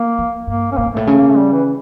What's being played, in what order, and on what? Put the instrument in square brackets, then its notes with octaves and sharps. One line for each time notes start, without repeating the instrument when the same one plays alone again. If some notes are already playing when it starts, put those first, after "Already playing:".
Already playing: [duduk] A#3
[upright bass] E3
[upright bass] G2 [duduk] A#3
[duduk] C#4
[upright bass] A2 [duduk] A#3
[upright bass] G2
[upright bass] A2 [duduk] A3
[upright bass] C#3
[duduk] A#3
A3
G3
E3